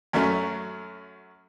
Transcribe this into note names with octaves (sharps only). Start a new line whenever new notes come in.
F#2 F#3 A3 C#4